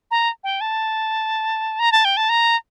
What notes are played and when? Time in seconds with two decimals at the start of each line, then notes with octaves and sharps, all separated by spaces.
0.11 A#5
0.44 G5
0.61 A5
1.80 A#5
1.92 A5
2.05 G5
2.17 A5
2.29 A#5